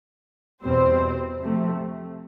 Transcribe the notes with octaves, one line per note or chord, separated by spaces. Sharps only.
E2 B2 G3 C4 C5
C3 F3 A3